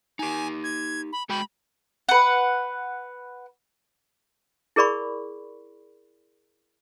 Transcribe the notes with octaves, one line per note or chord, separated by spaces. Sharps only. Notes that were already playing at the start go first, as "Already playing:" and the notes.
D#4 G4 G#5
G#6
B5
G#3 F#4 G5 B5
B4 F#5
E4 G#4 A#4 D5 B5 C#6